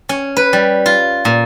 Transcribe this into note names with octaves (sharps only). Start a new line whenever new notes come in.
C#4
B4
G3
F4
A#2